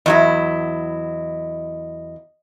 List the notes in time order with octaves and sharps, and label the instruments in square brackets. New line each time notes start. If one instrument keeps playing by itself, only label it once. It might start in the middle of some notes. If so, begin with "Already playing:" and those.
[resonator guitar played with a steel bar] E2 F#3 E4 [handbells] D#5